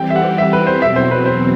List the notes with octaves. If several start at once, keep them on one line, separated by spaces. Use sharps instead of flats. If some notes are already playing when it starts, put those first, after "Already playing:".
Already playing: E3 G3 C4 G4 G5
E5
F#5
E5
B4
C5
E2 B2 F#3 C4 E5
C5
B4
C5